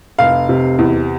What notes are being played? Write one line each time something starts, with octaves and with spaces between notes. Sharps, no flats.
F1 F5
C3
E2